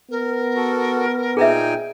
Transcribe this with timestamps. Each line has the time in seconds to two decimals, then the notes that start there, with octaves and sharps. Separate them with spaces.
0.10 B3 A#4
0.56 F#4 A4
1.37 A#2 D#4 G#4 B4 E5 G5 G#5